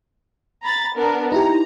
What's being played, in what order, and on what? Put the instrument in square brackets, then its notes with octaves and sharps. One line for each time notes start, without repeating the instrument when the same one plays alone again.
[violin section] A#5 B5 A6
B3 D4 A#4
[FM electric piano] D#4 E4 G4 [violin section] A#5